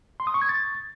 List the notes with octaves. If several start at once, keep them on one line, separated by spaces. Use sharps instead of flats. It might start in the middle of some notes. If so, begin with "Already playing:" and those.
C6
D#6
C#6
G#6
A6